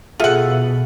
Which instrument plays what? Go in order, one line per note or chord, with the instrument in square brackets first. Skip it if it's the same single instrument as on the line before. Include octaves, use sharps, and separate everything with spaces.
[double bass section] B2 [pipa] F4 F#5 [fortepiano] G#4 A4 E5